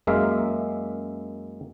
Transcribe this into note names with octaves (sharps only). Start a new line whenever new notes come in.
F#2 G#3 A#3 E5 F5